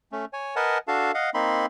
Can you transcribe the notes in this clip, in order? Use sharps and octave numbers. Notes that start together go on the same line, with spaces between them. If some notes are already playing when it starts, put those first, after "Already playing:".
A3 C#4
C#5 G#5
A#4 B4 D#5 F#5 G#5 A5
D4 F#4 A4 F5 A5
D#5 F5 F#5
A#3 C4 D#4 B5 C6